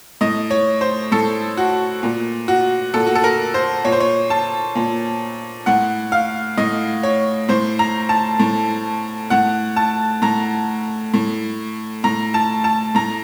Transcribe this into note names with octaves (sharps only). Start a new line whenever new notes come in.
A2 D#5
C#5
C5
A2 A4
F#4
A#2
F#4
A#2 A4
F#4
A4
A#4
C5
A#2 C#5
C5
C#5
A5
A#2
A2 F#5
F5
A2 D#5
C#5
A2 C5
A#5
A5
A2
A2 F#5
A5
A2 A#5
A2
A2 A#5
A5
A5
A2 A#5